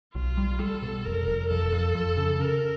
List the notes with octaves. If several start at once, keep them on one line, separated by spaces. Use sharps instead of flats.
B1 F4
G3
G3 A4
B2
F1 A#4
F1
F2 A4
F2
F2
C#3
C#3 A#4